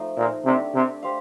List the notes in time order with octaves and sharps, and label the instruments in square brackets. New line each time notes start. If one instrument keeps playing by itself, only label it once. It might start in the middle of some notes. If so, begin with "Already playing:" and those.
Already playing: [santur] F3 A3 D#4
[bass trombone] A#2
[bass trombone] C3 [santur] A3 D4 G4
[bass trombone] C3
[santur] G4 C5 F5